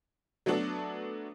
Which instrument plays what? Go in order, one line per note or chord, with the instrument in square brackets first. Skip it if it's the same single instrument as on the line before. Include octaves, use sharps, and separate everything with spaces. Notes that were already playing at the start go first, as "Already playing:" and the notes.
[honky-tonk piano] F#3 A3 B3 D4 F#4 A4